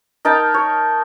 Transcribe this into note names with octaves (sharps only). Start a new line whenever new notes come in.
D#4 A#4 G5 A5
C#5